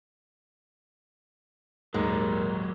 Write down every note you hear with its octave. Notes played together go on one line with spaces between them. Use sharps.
D#1 D#2 G#2 F#3 G#3 G4 A#4